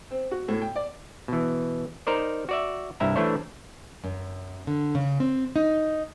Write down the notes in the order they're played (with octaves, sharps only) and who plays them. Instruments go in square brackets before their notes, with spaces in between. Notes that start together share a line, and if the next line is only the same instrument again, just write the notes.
[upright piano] C4
F#4
A2
G5
D5
[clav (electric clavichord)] B2 E3
D#4 A#4 C5 D5
F#4 D5 E5
C2 G2 E4 E5 A#5
E3 A3 D4 E4 C5 C#5
[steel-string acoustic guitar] F#2
D3
C#3
C4
D#4